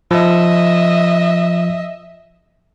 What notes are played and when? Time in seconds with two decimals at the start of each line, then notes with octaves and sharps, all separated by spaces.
0.11 F3 D#5 E5